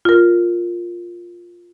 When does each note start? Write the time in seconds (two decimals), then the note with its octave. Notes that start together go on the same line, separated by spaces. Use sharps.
0.05 F4 A#4